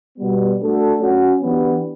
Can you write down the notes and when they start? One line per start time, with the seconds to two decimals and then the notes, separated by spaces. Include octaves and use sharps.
0.17 B2 G3 B3
0.60 A3 D4 F#4 A4
1.00 F#3 C#4 F#4
1.42 E3 B3 D4 G4 B4